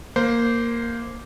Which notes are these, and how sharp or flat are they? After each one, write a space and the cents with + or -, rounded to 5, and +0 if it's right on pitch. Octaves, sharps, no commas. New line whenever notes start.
A#3 +0 C5 -10